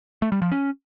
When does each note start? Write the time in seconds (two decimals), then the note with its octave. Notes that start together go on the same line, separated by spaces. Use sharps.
0.22 A3
0.32 G3
0.42 F3
0.52 C#4